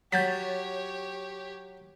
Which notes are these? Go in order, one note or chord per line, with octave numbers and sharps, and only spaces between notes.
F#3 G4 C#5 G6 A6 B6